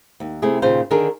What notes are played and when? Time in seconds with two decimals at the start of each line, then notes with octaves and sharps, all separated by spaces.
0.20 D#2
0.42 C3 A3 C4 E4 G#4
0.62 D#2 A#2 C#3 F4 C5 F5
0.91 D3 D#3 D4 G#4 A#4